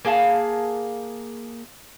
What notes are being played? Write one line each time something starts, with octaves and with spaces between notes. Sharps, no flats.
A#3 G#4 F5 A5